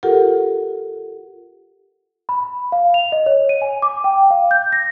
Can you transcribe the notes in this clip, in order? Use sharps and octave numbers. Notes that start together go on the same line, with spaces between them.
F4 G4 A4 A#4 F#5
B5
F5
F7
D#5
C#5
D#7
G#5
D6
G5
F5
G6
A#6